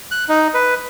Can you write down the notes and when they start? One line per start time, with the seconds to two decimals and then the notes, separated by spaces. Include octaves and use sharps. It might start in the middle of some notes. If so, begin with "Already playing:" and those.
0.11 F#6
0.29 D#4
0.54 B4